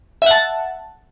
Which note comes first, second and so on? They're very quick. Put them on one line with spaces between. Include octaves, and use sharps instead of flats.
E5 F#5 A5